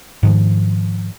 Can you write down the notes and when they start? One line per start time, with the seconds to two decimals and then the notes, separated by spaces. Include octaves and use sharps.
0.23 G#2 D#3 F3